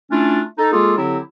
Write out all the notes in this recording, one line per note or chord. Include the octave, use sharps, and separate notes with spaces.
A3 C#4 D4 E4 F4
D#4 A4
G#3 A#3 F4 G#4 A4
D3 F#3 C4 E4 G4